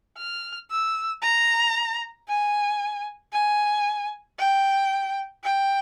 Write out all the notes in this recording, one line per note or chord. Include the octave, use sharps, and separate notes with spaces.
F6
E6
A#5
G#5
G#5
G5
G5